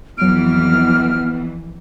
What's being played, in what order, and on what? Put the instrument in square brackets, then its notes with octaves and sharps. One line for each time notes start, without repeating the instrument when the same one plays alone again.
[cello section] F2 E3 [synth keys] F#3 D7 [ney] B3 [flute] F6